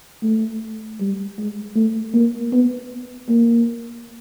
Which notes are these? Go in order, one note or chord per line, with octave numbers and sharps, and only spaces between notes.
A3
G3
G#3
A3
A#3
B3
A#3